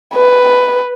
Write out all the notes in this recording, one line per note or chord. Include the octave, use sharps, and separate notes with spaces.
B4